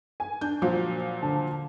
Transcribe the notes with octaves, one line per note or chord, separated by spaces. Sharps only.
G#5
D4 G6
A#2 F3 F#3
D3 A5